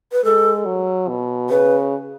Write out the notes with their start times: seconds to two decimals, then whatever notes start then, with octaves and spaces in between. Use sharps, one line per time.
0.12 B4
0.24 G#3 A4
0.66 F#3
1.08 B2
1.50 C#3 B4